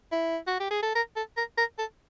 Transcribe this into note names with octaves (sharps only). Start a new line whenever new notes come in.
E4
F#4
G4
G#4
A4
A#4
A4
A#4
A#4
A4